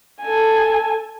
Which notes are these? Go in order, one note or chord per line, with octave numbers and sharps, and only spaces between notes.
A4 G#5